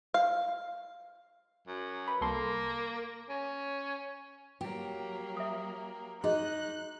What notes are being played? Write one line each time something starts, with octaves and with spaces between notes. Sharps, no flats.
F5
F#2
B4
C2 A#3 A4 C6
C#4
F#3 A#3 G4
E5 D#6
D#4 F#4 G#4 D#5 F#6